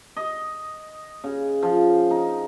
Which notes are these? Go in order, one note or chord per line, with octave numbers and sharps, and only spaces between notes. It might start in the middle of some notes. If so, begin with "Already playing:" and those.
D#5
C#3
F3
D#4